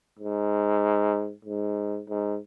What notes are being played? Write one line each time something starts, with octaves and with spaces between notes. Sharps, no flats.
G#2
G#2
G#2